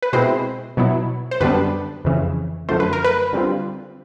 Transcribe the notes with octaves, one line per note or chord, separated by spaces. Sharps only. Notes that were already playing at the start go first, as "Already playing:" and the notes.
B4
B2 G#3 C4 E4 C5
B2 F#3 B3 E4
C5
F#2 D3 G3 B3 D4 B4
F2 C#3 E3
F#2 D3 F3 A3 C5
B4
A#4
B4
D3 G3 C4 F4